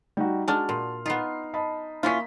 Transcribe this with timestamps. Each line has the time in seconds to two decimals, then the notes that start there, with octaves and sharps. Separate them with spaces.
0.17 G3 D#4 F#4
0.48 G#3 D4 F#4 A5 F6
0.69 A#2 C6
1.06 B3 D#4 F4 C7
1.54 D#5 A5 B5
2.03 A#3 C#4 E4 F4 B6